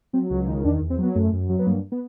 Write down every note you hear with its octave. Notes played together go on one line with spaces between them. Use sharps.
F#3 C4
C#2
D#3 D#4
E2 D4
E2
C4
F#3 B3
F#2 A3
F#2
F#3
B3
G2 A#3
B3